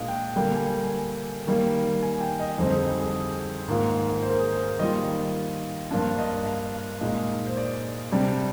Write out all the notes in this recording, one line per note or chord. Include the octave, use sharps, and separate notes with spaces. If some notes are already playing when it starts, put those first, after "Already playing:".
Already playing: A#2 G#3 D4 A#4 F5
G5
D3 G3 A#3 G5
G#5
G#5
D#3 G3 A#3
G#5
G5
D#5
F2 D3 G3 C4 D#4 C5
G#4
G#4
G#2 D#3 A#3 F4
C5
A#4
G#4
C5
D#3 G3 A#3 F4 D#5
G2 F3 A#3 D4 F4
D#5
F5
A#2 G#3 D#4
C5
D5
C3 G3 D4 D5